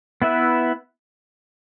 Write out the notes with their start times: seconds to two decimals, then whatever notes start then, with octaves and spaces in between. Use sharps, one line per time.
0.22 B3 E4 B4 E5